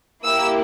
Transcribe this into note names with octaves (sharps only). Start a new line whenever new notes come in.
A#3 E4 G4 E6